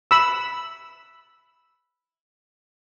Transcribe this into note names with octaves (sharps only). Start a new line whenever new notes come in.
B5 E6